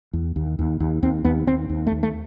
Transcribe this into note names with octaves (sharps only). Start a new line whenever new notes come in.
E2
D#2
D#2
D#2
D#2 C4
D#2 B3
D#2 C4
D#2
A3
D#2
A3